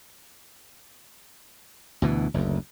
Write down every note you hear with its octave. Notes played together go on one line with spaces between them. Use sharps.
D2 B2 E3
F#1 D2